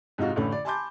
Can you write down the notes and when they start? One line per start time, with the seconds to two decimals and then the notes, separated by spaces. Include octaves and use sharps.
0.18 G#2 C3 D#4 F4 F#4
0.36 A1 D3 A3 C#4 B5
0.52 D5
0.65 G#5 A5 B5 C6 D6 G6